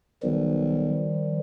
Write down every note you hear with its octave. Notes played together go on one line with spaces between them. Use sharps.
B1 D#3 F3 G3